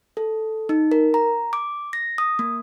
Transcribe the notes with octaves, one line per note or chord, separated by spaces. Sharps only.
A4
D#4
A#4
A#5
D6
A#6
D#6
A#3